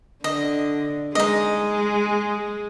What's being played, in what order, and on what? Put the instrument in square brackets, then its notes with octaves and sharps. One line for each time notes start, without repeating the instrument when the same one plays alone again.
[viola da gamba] D3 [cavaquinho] D#5
[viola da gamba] G#3 [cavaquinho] D#4 D#5